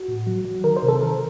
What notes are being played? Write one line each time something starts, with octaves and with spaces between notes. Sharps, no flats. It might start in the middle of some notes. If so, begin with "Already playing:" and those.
Already playing: F#4
A2
F#3
F#3
D#3 A#4
C5
C3
A4
D#3 A#4